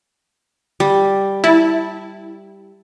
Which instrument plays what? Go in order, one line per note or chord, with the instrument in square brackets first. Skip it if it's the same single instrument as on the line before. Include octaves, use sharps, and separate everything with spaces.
[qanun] G3
[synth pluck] E4 [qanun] A5